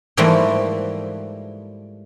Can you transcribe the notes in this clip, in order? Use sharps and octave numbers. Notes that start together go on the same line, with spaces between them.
G#2 E3 F3 G3 A3 A#3